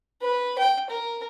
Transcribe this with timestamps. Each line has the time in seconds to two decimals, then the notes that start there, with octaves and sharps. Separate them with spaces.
0.22 B4
0.58 G5
0.90 A#4